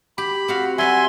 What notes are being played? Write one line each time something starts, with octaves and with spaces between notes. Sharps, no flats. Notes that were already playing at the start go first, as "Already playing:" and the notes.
G4 B5
C4 F#4 F5
F#3 G3 B4 E5 G#5 C6